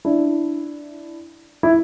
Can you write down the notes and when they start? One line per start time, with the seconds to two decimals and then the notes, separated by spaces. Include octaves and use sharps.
0.05 D4 E4
1.63 E4